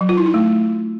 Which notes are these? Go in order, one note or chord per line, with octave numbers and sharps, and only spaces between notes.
F#3
F4
E4
D#4
A3